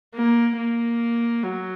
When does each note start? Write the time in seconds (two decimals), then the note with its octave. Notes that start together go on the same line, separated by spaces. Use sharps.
0.15 A#3
0.57 A#3
1.43 F#3